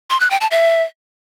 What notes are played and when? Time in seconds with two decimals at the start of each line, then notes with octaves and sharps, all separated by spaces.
0.10 C6
0.20 F#6
0.31 G5
0.41 A5
0.51 E5